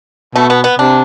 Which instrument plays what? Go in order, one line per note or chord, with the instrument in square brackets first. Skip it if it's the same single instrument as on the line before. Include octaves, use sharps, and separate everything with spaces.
[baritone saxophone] B2 [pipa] A3
[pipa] B3
B3
[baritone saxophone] C3 [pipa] D4